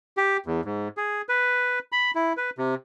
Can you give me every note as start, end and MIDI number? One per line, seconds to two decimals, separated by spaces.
0.17 0.37 67
0.46 0.61 40
0.65 0.88 44
0.97 1.22 68
1.29 1.79 71
1.92 2.11 83
2.15 2.33 64
2.37 2.50 71
2.58 2.75 48